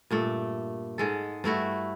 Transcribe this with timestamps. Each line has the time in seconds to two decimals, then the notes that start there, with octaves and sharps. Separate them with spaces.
0.11 G2 A#2 A3
0.98 G#2 G#3 A4
1.44 G2 A3 E4 F#4